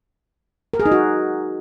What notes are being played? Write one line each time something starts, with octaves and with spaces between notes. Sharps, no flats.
A#4
G#4
D#4
F#4